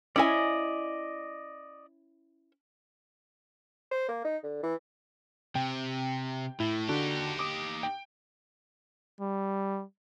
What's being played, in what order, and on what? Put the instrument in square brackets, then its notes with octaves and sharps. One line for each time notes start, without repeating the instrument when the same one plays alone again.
[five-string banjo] C#4 E4 G#5 [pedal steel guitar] D5 D#5
[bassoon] C5
A#3
D#4
D3
E3
[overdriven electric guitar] C3 [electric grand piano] G5
[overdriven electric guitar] A2 [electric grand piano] E4
[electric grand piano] D3 D4 F#4 [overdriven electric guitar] D#4 G4
[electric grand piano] D6 D#6
G5
[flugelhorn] G3